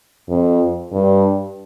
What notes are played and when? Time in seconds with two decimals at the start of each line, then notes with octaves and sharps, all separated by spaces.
0.29 F2
0.93 G2